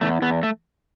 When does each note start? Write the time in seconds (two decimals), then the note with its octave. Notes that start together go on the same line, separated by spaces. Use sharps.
0.01 E2 A3
0.22 E2 B3
0.43 A3